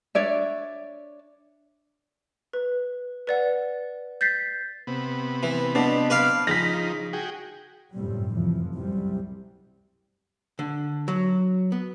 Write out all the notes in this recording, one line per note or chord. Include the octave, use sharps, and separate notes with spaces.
D4 C#5 D5 E5
B4
B4 D5 F#5
G6 A6 B6 C7
C3 B3
E3
B2 D4
B4 D5 F5
C#3 F3 D#4 A#6 B6
F#4 G#4 G5
G1 F#2 A2 C3 G3
F1 F#2 E3 F3
C2 F#2 C3 G3
D3
F#3
B3